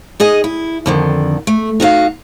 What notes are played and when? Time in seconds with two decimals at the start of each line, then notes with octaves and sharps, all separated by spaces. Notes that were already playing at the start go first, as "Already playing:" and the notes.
0.20 D#4 G#4 D#5
0.44 E4
0.86 F2 D3 D#3
1.47 A3
1.80 D#4 F#4 C5 F5